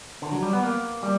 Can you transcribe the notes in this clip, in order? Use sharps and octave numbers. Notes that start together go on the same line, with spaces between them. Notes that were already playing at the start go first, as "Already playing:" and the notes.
D3
F#3
G3
B3
A#3
G3